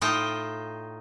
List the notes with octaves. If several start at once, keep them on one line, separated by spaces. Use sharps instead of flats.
A2 D#4 F4 D#5 G5 A5